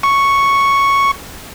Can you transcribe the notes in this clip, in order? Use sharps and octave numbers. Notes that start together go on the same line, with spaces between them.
C#6